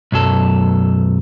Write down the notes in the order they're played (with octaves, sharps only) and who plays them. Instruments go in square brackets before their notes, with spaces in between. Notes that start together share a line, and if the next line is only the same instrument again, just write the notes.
[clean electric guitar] B1 F#2 F#3 A4